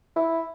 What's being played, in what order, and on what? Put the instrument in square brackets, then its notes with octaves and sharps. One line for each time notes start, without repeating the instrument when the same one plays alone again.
[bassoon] E4